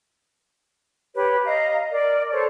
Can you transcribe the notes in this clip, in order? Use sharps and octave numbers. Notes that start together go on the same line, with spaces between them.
G4 B4 C#5
D#5 F5 A#5
A#4 D5
A4 C5 C#5 A5